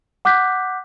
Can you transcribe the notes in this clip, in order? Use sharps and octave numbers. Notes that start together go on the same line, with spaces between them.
F#5 D6 F#6 G6 B6